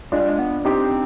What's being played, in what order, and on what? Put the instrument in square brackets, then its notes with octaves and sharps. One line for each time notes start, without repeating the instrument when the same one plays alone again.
[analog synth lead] G#3 [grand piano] D4 F4
[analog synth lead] G3
G#3
B3
[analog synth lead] C4 [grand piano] D#4 G4